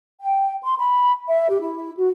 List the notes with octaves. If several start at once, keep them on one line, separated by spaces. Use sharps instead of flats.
G5
C6
B5
E5
G4
E4
F#4